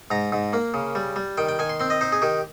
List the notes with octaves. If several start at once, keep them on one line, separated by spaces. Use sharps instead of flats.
G#2 A#5
G#2
A#3
C#3
G3
G3
D#3 G5
G5
D#3 G#5
C6
C4 C6
D#5
D#4 C5
G#4
D#3 G4